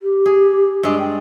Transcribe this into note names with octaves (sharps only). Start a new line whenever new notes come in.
G4
G#4
G2 G#3 D5
G5